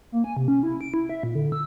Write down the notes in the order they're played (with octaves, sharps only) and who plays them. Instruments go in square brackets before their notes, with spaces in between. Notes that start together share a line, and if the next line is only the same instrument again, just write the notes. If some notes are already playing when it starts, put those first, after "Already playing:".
[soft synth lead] A#3
G#5
C3
C#4
E4
D7
E4
E5
A#2
D3
E6